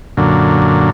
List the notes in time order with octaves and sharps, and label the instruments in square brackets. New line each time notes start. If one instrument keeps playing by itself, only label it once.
[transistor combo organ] F#2 A#2 D3